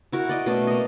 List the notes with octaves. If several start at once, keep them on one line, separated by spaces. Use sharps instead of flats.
E4 F#4 A#4
D5 D#5
B2 A3 C#4 D5
A#3 D#5